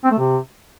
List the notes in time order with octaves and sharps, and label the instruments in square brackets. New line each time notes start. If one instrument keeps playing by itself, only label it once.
[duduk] C4
A3
C3